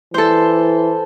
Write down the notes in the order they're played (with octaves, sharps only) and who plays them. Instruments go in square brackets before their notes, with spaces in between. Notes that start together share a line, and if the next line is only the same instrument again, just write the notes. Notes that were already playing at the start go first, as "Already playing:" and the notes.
[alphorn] E3 [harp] A4 C5